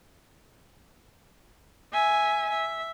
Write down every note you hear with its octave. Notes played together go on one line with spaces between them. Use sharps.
E5 G#5
E5